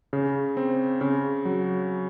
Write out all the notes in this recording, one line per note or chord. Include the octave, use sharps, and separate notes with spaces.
C#3
C4
C#3
F#3